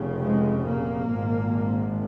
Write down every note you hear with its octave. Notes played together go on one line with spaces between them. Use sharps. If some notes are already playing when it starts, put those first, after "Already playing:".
Already playing: F1 C#3
G#2 G#3
A#2 A#3
G#1 G#2